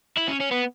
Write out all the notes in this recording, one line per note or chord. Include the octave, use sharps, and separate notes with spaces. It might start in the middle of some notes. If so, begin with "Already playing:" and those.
E4
C#4
C#4
B3